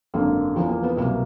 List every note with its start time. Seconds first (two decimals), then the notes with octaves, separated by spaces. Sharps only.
0.14 G#1 F#2 D3 A#3
0.56 E2 C#3 F3
0.69 A#3
0.83 B3
0.97 C2 B2 F#3 A#3